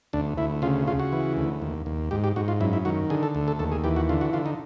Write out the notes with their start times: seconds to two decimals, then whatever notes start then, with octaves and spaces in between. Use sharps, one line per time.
0.13 D2 D4
0.38 D2 E4
0.62 C#3 F4
0.87 C#3 F4
1.00 F#4
1.12 E3
1.37 D2
1.62 D#2
1.86 D#2
2.11 G#2 G4
2.24 G4
2.36 G#2 F#4
2.48 F4
2.61 F#2 E4
2.73 E4
2.85 D#3 F#4
3.10 D3 G#4
3.23 A4
3.35 D2
3.48 A4
3.59 D#2 A4
3.72 G#4
3.84 E3 G4
3.96 F#4
4.09 D3 F4
4.21 F#4
4.33 D3 F4
4.46 D#4